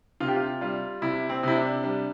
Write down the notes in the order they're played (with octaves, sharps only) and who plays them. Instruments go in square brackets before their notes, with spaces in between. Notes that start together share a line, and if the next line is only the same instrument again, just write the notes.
[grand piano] C3 F4
G4
F4
G3 F4
C3 E4
C4
C3 E4
D4
G3 D4